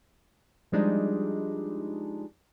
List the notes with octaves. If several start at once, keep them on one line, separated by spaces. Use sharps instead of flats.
F3 G3 G#3 D4 D#4